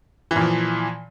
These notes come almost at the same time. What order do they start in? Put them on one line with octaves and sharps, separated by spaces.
E3 A#2 F3